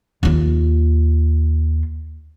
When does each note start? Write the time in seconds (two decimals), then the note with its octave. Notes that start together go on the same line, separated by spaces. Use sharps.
0.23 D#2 F4